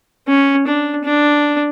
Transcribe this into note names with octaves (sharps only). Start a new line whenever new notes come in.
C#4
D4
D4